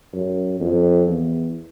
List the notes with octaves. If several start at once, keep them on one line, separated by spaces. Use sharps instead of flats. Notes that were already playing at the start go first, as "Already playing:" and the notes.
F#2
F2
E2